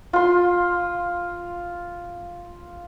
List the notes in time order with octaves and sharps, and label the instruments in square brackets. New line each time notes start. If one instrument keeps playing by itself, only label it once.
[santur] F4 C6